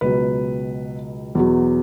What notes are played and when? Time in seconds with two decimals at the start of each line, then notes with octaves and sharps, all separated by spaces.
0.01 C#2 B2 F#3 B4
1.35 E2 B2 F#3